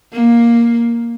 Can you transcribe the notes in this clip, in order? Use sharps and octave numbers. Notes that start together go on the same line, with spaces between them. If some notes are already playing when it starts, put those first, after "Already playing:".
A#3